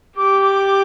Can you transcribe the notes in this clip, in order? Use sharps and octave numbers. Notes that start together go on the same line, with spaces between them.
G4 D6
D6